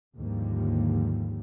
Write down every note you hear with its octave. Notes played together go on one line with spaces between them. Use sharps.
D#2 G#2 D3 F3 G3 A#3